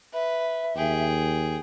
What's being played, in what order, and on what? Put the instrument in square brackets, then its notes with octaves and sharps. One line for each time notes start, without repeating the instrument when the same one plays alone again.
[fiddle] B4 [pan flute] E5
[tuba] D#2 [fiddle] G#4 G5